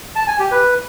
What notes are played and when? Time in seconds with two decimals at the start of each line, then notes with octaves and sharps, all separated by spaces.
0.16 A5
0.27 G#5
0.39 G4
0.51 B4